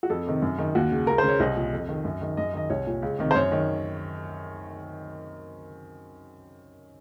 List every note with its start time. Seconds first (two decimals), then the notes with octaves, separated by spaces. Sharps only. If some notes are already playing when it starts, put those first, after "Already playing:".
0.03 F#4
0.10 F2 A4
0.27 C3 D#3
0.42 F#2
0.58 D#3
0.75 D#2 F#4
0.91 C#3
1.07 C#2 A#4
1.18 C5
1.23 C#3
1.29 C#5
1.40 C2 D#5
1.56 A#2
1.72 F2
1.89 D#3
2.05 F#2
2.22 D#3
2.37 F#2 D#5
2.54 D#3 D#5
2.70 C2 C#5
2.87 A#2
3.02 C#2
3.19 C3 D#3
3.31 C5
3.35 F#2 C#5
3.52 D#3